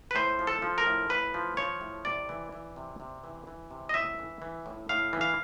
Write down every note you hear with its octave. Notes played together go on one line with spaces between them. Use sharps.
B4
A2 C5
F3
A4
F3
A#4
A2
A2 B4
F3
F3 C#5
A2
C3 D5
E3
E3
C3
C3
E3
E3
C3
D#5
A2 E5
E3
E3
A2
A2 F5
E3
F5